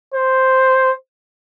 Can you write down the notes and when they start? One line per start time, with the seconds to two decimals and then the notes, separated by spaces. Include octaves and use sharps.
0.14 C5